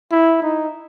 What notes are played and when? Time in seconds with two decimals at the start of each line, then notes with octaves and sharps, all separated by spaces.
0.12 E4
0.42 D#4